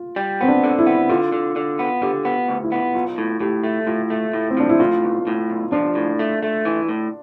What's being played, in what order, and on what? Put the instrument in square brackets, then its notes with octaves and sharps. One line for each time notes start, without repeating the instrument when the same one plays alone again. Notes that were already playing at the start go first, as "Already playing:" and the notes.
Already playing: [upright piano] F4
[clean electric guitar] G3
[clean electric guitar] B3 [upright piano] C4
[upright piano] D4
[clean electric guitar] D3
[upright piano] E4
[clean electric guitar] B3
[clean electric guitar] D3 [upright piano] F4
[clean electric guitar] D3
D3
B3
[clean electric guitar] D3 [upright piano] G4
[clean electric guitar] B3
D2
[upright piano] E4
[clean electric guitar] B3
[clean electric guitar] B1 [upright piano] F4
[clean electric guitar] A2
[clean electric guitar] A2 [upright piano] G4
[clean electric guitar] A3
[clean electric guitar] A2 [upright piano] F4
[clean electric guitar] A3
A2
[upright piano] C4
[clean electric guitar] F3 [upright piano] D4
[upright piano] E4
[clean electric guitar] A2 [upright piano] F4
[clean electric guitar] B1
A2
B1
[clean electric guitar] F3 [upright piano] D4
[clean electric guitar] A2
A3
A3
E3
A2